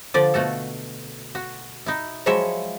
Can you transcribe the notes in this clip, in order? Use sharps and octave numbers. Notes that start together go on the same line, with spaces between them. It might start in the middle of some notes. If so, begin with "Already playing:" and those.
D3 F3 D5
B2 A3 F#4 A4
F#4
D#4 E4
F3 F#3 G#3 E4 C#5 E5